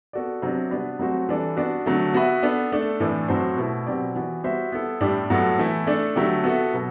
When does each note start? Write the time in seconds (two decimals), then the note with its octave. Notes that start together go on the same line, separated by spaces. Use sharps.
0.13 B3 F#4 A4 D5
0.42 C3 F#3 B3 D4
0.71 G3 B3 D4 F#4 B4
0.99 F#3 A3 C4 F#4
1.29 E3 G3 D4 A4
1.56 B3 D4 F#4
1.86 D3 F#3 A3
2.14 B3 F#4 B4 E5
2.43 B3 D4 A4
2.72 A3 D4 A4
3.00 A2 E3 A3 D4
3.28 A2 F#3 C4 F#4 C5
3.57 B2 A3 E4
3.87 B2 F#3 C4 G4 D5
4.15 E3 B3 F#4
4.43 G3 B3 F#4 C5 E5
4.72 B3 E4 A4
5.01 A2 G3 D4 G4
5.30 A2 F#3 B3 F#4 A4
5.59 E3 A3 E4
5.87 A3 D4 A4
6.16 D3 F#3 A3 E4 G4
6.44 B3 F#4 A4 E5
6.74 B2 F#3